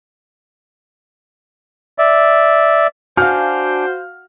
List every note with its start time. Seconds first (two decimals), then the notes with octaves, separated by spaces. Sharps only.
1.98 D5 E5
3.17 D4 F#4 C5 F5 G#5 F6 G6